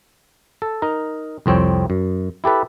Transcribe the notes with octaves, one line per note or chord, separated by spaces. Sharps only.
A4
D#4 A#4
C2 F2 C4 C#5 G5
F#2
E4 G4 A4 B4